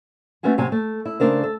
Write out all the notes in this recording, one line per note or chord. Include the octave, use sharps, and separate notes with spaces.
A3 B3 C#4 F#4 G#4
D#2 A2 C3 F#3 G#5
A3
E4
C#3 A3 D4 A#4 C5
A4